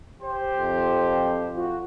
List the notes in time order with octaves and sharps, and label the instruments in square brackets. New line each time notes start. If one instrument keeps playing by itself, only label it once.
[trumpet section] G4 C5
[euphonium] F2
[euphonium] F4 [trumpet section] F#4